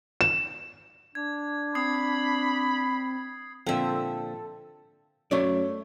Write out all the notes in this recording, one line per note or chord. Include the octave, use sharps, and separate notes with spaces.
E7
D4 G#6
C4 B5 D#6 G#6 C7
A#2 D3 F3 C4 A4 E5
F#2 A3 C#5 D5